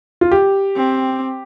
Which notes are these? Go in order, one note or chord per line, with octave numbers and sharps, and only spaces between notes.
F4
G4
C4